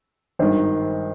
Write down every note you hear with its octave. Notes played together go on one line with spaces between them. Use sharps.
G#1 G2 D#3 C5